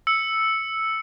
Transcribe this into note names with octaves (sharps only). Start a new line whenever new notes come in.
E6 C#7